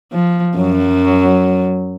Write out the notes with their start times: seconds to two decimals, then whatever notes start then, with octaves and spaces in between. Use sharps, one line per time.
0.12 F3
0.57 F#2 F#3